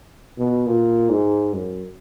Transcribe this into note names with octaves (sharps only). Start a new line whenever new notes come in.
B2
A#2
G#2
F#2